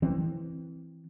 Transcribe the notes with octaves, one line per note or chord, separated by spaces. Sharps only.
E3 C4